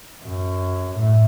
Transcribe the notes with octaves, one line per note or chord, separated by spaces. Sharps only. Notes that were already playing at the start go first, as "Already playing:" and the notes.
F#2
A2